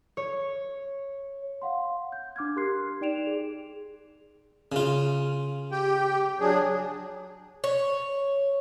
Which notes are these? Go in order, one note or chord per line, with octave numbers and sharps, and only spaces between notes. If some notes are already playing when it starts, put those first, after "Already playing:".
C#5
F5 F#5 C6
G6
D4 D6 F6 G#6
G4 A#4 C6 F#6 G#6 C7
D#4 D5 G5 D7 E7 F7
G#4
C#3 F4
G4 G5
F#3 D4 G#4
C#5